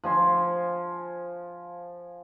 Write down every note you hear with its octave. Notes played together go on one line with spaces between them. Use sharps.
F3 G#5 C6